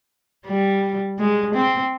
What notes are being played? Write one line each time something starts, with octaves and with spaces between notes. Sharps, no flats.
G3
G#3
C4